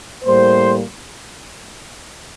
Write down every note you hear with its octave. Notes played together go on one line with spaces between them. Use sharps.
A2 G3 A#3 C5